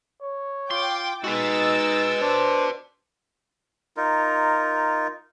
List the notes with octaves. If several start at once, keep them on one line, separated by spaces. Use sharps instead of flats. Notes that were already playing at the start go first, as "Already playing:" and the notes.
C#5
F4 G5 C6 D6
G#3 D#4 F#4 B4 E6 A6
D4 C5
D#4 F4 A#4